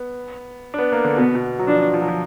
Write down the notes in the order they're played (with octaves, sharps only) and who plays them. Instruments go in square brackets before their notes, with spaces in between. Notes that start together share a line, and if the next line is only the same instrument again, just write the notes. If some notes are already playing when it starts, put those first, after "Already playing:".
Already playing: [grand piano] B3
D4
B3
A#3
D3
[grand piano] B2 [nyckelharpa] B3
[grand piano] B2
F#3
[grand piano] F3 [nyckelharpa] D4
[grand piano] F3
F#3
F3